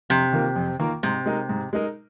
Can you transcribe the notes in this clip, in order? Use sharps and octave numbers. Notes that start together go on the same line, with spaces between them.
F2 C3
D#3 A#3 F4 A#4
F2
D#3 A#3 F4 A#4
G#2 C3
G#3 D#4 A#4
G#2
G#3 D#4 A#4